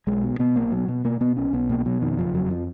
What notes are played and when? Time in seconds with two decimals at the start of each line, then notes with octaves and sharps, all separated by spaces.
0.07 B1 G#3
0.23 B2
0.39 B2 B3
0.56 B1 A#3
0.72 B2 F#3
0.88 B2
1.04 B2 A#3
1.20 B2 B3
1.37 B1 C#4
1.53 B1 B3
1.70 B2 A#3
1.86 B2 F#3
2.02 F2 D#3
2.19 F#1 F3
2.34 F2 F#3
2.50 F3